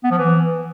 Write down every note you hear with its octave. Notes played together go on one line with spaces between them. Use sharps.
B3
F3
E3